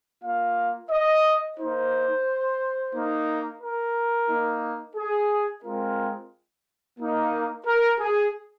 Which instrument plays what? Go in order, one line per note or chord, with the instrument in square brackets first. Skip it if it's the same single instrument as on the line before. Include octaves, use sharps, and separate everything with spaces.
[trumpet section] A#3 F4 F5
D#5
A#3 D#4 C5
A#3 D#4
A#4
A#3 D#4
G#4
G#3 C4 F4 A#4
A#3 D#4
A#4
G#4